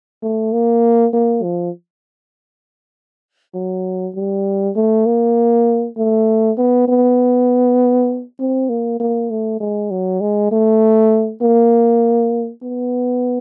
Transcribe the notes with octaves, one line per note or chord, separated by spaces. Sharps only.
A3
A#3
A#3
F3
F#3
G3
A3
A#3
A3
B3
B3
C4
A#3
A#3
A3
G#3
F#3
G#3
A3
A#3
B3